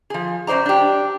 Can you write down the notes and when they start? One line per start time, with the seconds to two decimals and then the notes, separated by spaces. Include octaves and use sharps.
0.10 F3 G#4
0.47 F#2 D#3 C5 D5 A#5
0.66 D4 G4